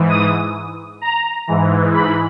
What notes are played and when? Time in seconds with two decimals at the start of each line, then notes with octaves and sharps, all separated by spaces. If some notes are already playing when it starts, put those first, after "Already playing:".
Already playing: G#2 E3
0.09 D#6
1.02 A#5
1.48 G#2 E3
1.94 B5